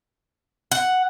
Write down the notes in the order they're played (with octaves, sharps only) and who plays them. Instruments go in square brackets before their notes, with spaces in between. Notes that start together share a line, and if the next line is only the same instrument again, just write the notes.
[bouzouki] F#5